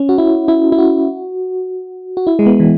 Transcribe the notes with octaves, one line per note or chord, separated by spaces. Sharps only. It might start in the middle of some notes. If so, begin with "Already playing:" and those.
Already playing: C#4
F#4
E4
E4
E4
F#4
F#4
E4
G#3
B3
E3